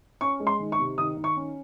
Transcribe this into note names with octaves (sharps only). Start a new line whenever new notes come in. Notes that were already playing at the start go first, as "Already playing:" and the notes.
C#4 C#6
G#3
C6
D#3
C#6
C3
D#3 D#6
D#3
C#6
C#4